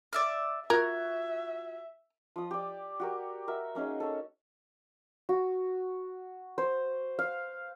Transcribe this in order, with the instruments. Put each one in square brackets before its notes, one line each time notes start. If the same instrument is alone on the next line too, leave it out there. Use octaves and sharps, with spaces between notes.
[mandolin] D5 E5 F6
[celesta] F4 G#6 [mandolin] F#4 [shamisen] A#4 [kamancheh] E5
[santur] F3 D#6
G4 D5
F#4 G4 A#4
F#4 A#4 E5
A#3 C#4 D#4 G#4
A4 C#5
F#4
C5
F5